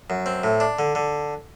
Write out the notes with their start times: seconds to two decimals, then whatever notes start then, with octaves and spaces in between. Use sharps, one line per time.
0.10 F#2
0.26 C4
0.44 A2
0.60 D4
0.79 D3
0.95 D3